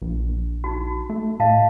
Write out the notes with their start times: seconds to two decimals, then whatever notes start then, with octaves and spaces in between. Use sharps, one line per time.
0.02 A#1
0.64 D#4 F#4
1.09 A3
1.40 A2 D#5 F5 A5